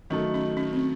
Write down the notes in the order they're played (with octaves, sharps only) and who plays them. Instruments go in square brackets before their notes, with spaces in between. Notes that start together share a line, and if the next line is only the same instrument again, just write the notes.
[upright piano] D#3 F#3 A3 [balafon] C#4
[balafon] C#4
C#4
C4